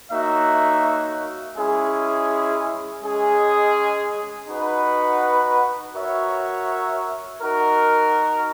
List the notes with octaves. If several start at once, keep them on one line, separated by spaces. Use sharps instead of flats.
A#3 D#4 F#4 C#5 E5
G#3 C#4 E4 G#4
G#3 C#4 G#4 D#5
D#4 F#4 B4 F#5
F#4 A#4 C#5 E5
D#4 F#4 A#4